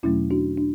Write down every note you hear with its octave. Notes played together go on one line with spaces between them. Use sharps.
E2 B2 F#3 A3 C#4 E4
D4 F#4
D4